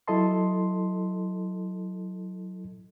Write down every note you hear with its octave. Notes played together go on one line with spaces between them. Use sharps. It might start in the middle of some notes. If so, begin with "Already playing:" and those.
F#3 E4 A4 D#5 A5 C6